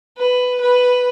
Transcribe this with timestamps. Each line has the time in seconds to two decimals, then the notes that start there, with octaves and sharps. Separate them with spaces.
0.18 B4
0.61 B4